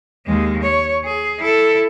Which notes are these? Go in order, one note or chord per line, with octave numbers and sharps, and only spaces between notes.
D#2 G#3
C#5
G#4
E4 A4